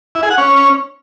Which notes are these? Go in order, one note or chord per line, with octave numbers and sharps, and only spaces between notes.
E4
G#4
F#5
C#4